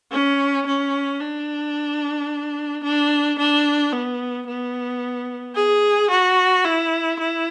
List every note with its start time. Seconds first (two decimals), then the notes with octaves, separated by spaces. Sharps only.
0.12 C#4
0.67 C#4
1.21 D4
2.84 D4
3.39 D4
3.93 B3
4.47 B3
5.56 G#4
6.10 F#4
6.65 E4
7.19 E4